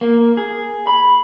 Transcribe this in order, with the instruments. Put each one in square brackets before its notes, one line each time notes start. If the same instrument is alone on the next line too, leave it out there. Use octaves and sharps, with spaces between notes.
[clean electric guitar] A#3
G#4
B5